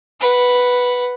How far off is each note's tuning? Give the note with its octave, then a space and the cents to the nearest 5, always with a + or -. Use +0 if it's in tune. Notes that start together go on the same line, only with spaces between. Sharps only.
B4 +0 F#5 +0